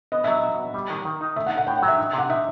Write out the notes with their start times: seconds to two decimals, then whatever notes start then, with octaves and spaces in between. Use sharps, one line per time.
0.12 B3 D#5
0.24 F#3 E5
0.36 D#5
0.43 F#4
0.59 B3
0.74 G3
0.90 D#3
1.05 D#3
1.21 D#4
1.36 A3 E5
1.46 F#5
1.51 D#4
1.57 F#5
1.67 A2 G5
1.78 F#5
1.82 F#3
1.88 E5
1.98 D#4
2.13 C3 F#5
2.29 D#4 E5